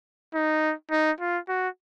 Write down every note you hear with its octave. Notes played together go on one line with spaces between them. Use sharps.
D#4
D#4
F4
F#4